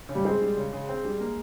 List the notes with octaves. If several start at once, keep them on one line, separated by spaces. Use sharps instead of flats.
C#3
G3
G#3 C4
G3
C#3
C#3
C4
G3
A#3